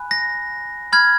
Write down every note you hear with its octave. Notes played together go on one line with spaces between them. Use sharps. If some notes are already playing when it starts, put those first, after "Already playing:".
Already playing: G#5 B5 F#6
A#6
B5 F6 G#6